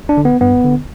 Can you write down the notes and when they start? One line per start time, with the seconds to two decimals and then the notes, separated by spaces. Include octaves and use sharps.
0.09 D4
0.17 D3
0.25 B3
0.41 G2 B3
0.65 D3